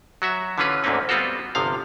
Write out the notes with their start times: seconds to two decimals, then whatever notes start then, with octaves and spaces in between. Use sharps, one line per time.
0.22 F#3 F#4 E5
0.58 D3 E3 C#4 F4 B4
0.84 D2 G#2 D3 A#3 C4 C#4
1.09 G3 B3 C4 F4 F#4 A4
1.55 G1 C3 F3 F5